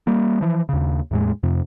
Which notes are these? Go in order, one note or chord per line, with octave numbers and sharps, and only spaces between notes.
G3 A#3
E3 F3
D#2 C#3
E2 A2 G#3
F2 C3